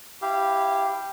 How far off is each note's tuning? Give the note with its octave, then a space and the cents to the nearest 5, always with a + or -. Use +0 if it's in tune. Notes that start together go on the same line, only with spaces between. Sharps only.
E4 +0 G4 +0 F5 -25